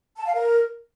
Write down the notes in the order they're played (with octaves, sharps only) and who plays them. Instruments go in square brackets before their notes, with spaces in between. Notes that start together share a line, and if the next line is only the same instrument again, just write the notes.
[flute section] A5
F5
A#4